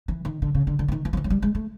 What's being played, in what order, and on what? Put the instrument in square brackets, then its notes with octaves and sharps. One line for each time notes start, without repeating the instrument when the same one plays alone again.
[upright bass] E3
D#3
D3
C#3
D3
D3
E3
D#3
E3
F3
E3
F#3
G3
G#3
A3